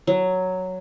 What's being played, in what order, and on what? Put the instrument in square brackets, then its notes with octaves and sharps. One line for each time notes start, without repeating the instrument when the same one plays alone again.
[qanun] F#3